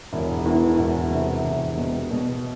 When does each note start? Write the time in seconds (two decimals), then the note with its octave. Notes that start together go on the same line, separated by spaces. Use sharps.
0.13 E1
0.46 E2
0.79 E1
1.11 C3
1.44 E1
1.77 B2
2.11 B2